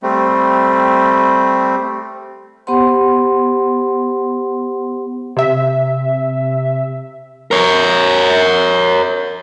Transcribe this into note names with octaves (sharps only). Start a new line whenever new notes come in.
G3 A3 C4
B3 G4 C5 F#5 C6
C3 E5
A#4 C#5